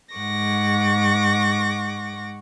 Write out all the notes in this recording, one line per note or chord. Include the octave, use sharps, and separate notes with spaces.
G#2 F#5 C#6 D6 A#6